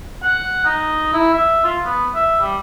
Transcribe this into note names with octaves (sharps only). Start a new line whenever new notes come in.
F#5
D#4
E4
E5
F4
B3
E5
G3